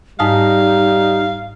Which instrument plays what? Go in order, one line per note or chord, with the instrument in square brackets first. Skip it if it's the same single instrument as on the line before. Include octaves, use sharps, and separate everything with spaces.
[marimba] G#2 A5 D#6 [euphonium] G3 [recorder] D#4 [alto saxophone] F5